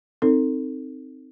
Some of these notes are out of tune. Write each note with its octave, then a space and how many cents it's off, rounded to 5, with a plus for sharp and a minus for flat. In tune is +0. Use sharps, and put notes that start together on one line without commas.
C4 +0 D#4 +0 A4 +30